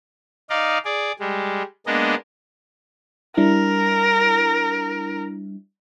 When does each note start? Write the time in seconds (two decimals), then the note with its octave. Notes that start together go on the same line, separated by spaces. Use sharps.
0.50 D#4 D5 D#5 F5
0.85 G#4 D5
1.20 G3 G#3
1.86 G#3 A#3 B3 D4 D#5
3.37 G3 D4 E4 A#4